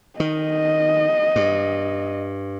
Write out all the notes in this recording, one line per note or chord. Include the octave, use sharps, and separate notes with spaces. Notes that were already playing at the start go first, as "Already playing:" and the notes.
D#3 D#5
G2